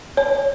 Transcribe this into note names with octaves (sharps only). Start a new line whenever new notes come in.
C#5